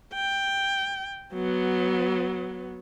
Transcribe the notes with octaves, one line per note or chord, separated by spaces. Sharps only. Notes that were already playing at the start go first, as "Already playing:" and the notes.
G5
F#3 B3